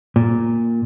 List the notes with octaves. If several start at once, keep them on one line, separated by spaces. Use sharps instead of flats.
A#2